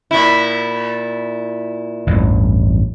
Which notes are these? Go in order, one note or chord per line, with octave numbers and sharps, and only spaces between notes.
A#2 E4
A1 E2 G2